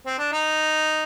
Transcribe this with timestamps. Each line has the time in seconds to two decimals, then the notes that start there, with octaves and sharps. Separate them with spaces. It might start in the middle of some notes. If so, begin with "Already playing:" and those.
0.06 C4
0.19 D4
0.32 D#4